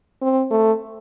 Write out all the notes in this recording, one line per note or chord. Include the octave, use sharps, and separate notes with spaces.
C4
A3